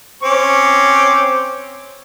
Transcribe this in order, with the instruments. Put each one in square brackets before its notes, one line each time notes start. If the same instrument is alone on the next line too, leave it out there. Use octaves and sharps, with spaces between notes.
[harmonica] C4 C#4 D6